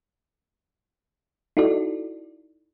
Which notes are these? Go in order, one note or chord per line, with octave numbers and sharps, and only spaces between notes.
D#4 E4 F#4 A4 D5